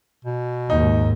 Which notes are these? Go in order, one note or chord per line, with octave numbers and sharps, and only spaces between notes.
B2
D#2 G#2 D#4